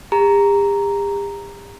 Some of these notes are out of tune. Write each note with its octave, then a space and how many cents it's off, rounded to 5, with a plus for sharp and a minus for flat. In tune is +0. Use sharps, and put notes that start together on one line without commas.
G4 +45 A#5 +0